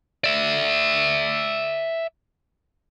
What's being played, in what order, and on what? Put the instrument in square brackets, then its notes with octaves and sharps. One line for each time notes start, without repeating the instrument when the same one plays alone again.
[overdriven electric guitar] D5 E5